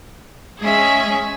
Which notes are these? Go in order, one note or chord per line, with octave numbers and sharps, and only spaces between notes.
G#3 C#4 G#4 E5